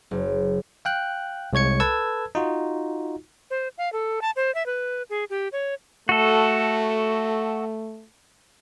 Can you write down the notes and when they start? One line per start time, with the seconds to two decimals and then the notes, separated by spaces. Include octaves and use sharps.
0.11 F#1
0.85 F5 G5 F#6
1.53 C2 G#3 C#5 G#6 C#7
1.80 A4 B4 A5 E6 G#6
2.35 D#4 F4 F#4
3.50 C5
3.78 F5
3.93 A4
4.22 A5
4.36 C5
4.55 E5
4.66 B4
5.10 G#4
5.30 G4
5.52 C#5
6.09 A3 F#4 A4